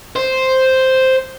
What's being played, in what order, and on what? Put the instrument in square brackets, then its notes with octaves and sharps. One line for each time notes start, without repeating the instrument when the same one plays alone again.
[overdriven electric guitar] C5